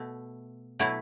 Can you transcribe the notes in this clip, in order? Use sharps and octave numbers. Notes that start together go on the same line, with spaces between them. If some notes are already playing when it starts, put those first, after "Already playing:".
Already playing: B2 A3
B2 F#3 A3 E4